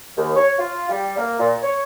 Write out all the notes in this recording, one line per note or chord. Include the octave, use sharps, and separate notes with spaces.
D#2
C#5
F4
G3
A#3
A#2
C#5